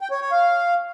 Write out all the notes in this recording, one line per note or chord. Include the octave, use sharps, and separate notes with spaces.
G5
C#5
C#5
F5